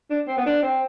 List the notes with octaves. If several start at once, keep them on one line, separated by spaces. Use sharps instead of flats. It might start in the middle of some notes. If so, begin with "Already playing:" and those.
D4
C4
B3
D4
C4